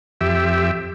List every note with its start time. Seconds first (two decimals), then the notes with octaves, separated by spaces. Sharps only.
0.21 F2 G4 E5